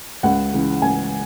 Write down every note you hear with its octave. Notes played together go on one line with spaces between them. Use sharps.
C#2 F#5
C#3 E3
C#2 G#5